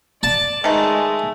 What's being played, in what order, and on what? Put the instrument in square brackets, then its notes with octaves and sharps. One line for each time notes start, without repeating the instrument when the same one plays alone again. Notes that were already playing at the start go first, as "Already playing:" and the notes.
[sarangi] D5 [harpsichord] A5
[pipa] D#3 A3 B4 [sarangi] G#3